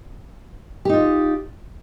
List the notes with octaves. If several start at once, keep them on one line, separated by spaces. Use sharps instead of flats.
D#4 F4 G4